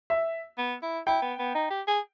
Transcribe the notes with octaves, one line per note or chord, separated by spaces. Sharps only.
E5
B3
E4
E4 G5
B3
B3
D#4
G4
G#4